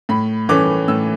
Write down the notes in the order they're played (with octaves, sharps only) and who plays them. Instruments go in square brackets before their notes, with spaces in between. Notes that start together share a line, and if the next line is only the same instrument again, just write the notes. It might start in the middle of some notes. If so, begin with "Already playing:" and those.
[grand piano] A2 B5
E3 A3 C#4 D6
A2 E6